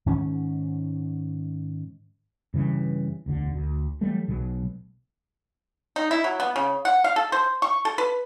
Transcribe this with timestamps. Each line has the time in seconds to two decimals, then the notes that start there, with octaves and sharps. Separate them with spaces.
0.06 G#2 D#3 C#4
2.54 G2 C#3 E3
3.26 E1 D2 D3
3.53 D2
4.01 E3 F#3 G3 A3
4.28 B1 B2 F#3 G#3
5.96 D#4
6.11 E4
6.24 F#3
6.40 B3
6.56 C#3
6.85 F#5
7.04 F5
7.16 A4
7.32 C5
7.62 C#6
7.85 A4
7.98 B4